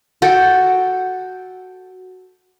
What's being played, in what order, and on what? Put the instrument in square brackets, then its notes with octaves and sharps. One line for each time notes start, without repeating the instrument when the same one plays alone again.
[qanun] F#4 A4 G5